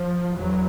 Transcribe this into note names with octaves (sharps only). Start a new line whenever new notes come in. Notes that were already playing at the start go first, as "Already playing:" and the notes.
Already playing: F3
E2 F#3